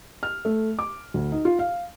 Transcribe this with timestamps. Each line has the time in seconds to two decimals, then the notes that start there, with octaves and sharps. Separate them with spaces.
0.23 F6
0.45 A3
0.79 D6
1.14 D2
1.32 D#4
1.45 F4
1.59 F5